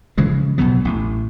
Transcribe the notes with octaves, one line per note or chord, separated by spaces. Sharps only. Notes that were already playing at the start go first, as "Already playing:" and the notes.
C#3 E3 F3 G#3
A#1 B2 F#3 B3
A1 A2